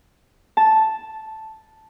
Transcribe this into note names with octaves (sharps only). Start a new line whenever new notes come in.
A5